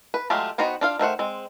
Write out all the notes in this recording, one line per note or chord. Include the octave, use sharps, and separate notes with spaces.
B4
F#3 G#3 A3 F4 G4
B3 D#4 F#4 C5 G5
D4 F4 F5
D#3 A3 C5 F#5
G#3 C4